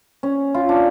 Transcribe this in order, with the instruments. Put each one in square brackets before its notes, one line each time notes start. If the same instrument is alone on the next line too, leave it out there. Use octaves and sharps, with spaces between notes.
[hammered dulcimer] C#4
F4
D4